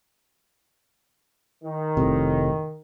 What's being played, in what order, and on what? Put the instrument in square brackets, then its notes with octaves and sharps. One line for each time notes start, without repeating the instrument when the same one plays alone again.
[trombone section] D#3
[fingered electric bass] F1 A2 C3